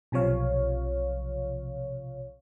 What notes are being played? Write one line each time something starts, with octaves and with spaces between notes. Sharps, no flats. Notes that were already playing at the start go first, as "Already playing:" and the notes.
B1 C3 F3 C#5 F5